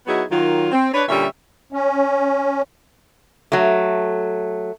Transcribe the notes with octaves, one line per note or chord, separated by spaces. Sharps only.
F#3 B3 D#4 E4 F#4 G#4
D#3 F#3 F4
C4
D4 B4 C#5
A#2 D3 G3 C#4 E5
C#4
F#3 A3